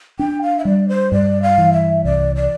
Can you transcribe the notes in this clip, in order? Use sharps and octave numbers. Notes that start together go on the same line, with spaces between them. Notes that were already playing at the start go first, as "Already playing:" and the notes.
D4 G5
F5
E5
G3 D5
C5
G2 D5
F5
E3
E5
C2 D5
D5